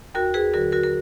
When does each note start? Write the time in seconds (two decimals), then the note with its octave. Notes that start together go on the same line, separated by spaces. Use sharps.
0.15 D#2 F#4 A#4
0.34 G#4 B4
0.54 D3 F#3 F#4 A#4
0.72 F#4 A#4
0.84 A#4